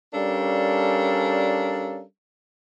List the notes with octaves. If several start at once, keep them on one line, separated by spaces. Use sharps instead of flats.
G3 C#4 D4 A4 A#4 F5